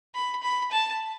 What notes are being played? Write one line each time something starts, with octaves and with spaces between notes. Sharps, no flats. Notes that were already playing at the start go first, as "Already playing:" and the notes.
B5
B5
A5